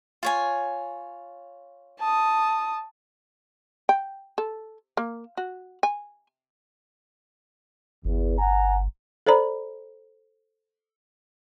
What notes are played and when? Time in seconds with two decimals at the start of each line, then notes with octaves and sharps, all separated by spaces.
0.23 F4 C#5 G#5
2.00 A5 D#6
3.89 G5
4.38 A4
4.97 A#3
5.37 F#4
5.83 G#5
8.05 G1 E2
8.39 F#5 G#5 A#5
9.27 A4 C5 D5 A#5 B5